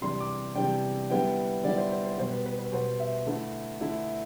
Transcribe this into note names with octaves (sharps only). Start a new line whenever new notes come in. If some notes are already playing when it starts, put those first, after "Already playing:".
C3 E3 G3 D4 C6
D6
C3 E3 G3 D4 G5
D3 G3 B3 E4 G5
D3 G3 B3 E4 D5
C5
C5
C5
B2 G3 B3 C5
B4
B4
B4
B2 G3 B3 C5
E5
D3 A3 E4
D3 A3 E4